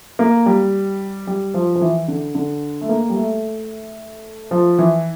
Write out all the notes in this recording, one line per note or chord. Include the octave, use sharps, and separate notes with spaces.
A#3
G3
G3
F3
F3
E3
D3
D3
A3
A#3
G3
A3
F3
E3